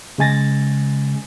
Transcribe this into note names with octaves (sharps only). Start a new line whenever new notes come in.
C#3 G#3 G#5 A6 A#6